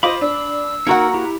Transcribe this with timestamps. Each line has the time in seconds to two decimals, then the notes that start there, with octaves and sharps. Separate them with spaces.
0.03 F4 C5 D#5 B5 D6
0.21 D4 E6
0.87 A#3 D#4 F#4 A#4 F#5 A#5 C#7
1.14 E4 G4